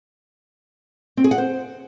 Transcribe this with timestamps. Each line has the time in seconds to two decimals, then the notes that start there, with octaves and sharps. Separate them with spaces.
1.17 C4
1.24 G#4
1.31 F#5
1.38 C5